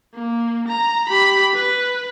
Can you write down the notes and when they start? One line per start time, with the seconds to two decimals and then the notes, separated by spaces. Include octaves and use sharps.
0.14 A#3
0.68 A#5
1.09 G4 B5
1.54 B4